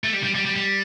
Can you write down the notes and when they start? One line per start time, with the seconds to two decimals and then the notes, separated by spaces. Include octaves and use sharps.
0.04 A3
0.13 G3
0.23 G3
0.35 G3
0.45 G3
0.56 G3